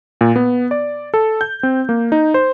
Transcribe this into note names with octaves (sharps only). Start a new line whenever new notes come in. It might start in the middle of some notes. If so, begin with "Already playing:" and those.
A#2
B3
D5
A4
G6
C4
A#3
D#4
C5